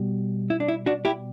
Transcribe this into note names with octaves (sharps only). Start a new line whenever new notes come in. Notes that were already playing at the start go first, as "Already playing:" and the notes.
Already playing: B2 G3
E4
D4
E4
D4 F#4
E4 G4